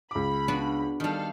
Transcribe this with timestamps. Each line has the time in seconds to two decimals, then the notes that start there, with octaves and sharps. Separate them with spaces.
0.11 C#2 B5 D6
0.48 B3 D4 F#4
1.00 D#3 G3 D4 A4 F5